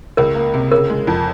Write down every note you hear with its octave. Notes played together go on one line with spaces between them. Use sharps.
C#2 A#4
A#3
C3
C#3 A#4
G#3
F2